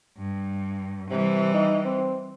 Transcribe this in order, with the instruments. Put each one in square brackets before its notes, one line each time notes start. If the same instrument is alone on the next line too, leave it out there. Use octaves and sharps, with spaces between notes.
[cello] G2
[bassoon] C3 [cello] E3 G3
[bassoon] D#4
C4